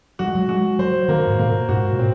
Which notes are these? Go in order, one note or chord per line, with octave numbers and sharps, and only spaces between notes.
F#3 F#4
G#3
F#3
G#3 F#4
F#3 C5
D#3 A#3
G#2
A#2 A#3
G#2 F#4
A#2
C4